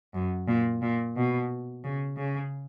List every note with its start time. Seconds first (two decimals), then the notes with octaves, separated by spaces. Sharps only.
0.14 F#2
0.47 A#2
0.82 A#2
1.16 B2
1.84 C#3
2.17 C#3